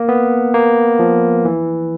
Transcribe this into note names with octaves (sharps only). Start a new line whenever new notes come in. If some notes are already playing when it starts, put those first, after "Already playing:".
Already playing: A#3
B3
A#3
F3
E3